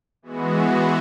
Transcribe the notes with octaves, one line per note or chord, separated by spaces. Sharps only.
E3 G#3 B3 F#4